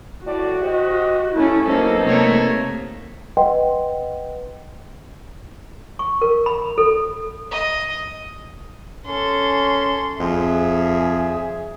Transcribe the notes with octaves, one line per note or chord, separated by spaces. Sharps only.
A2 F#4 D5
G4 C5 D#5
A3 C#4 E4
F#3 A#3 B3 C#4 D#4 A4 C5
C3 A3 A#3 C#5
B4 D#5 F#5 G5 C6
C#6
A#4
B5
A4
D#5
C#4 A4 C6
F2 G#4 E5